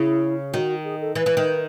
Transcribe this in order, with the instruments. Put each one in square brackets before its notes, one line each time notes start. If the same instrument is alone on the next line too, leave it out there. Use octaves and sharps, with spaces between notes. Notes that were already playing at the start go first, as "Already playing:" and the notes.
Already playing: [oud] C#3 [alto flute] E4
[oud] D#3 [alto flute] F#4
[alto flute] G#4
A4
[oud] E3 [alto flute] B4
[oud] E3
D#3